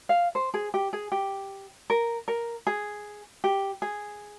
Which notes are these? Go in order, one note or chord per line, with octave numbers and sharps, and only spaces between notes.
F5
C5
G#4
G4
G#4
G4
A#4
A#4
G#4
G4
G#4